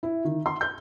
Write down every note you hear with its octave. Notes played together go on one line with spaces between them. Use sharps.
E4
D#3
C6
G6